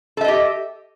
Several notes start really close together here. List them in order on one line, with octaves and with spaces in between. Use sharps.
A4 E5 D#5 G4